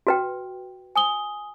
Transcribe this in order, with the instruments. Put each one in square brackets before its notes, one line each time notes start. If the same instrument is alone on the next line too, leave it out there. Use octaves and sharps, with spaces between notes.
[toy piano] F#4 B4 G5
[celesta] G#5 D#6 G7